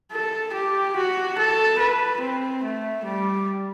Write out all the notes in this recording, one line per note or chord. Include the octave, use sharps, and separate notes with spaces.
A4
G4
F#4
A4
B4
C4
A3
G3